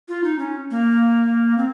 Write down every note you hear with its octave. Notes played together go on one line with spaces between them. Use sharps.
F4
D#4
C#4
A#3
C4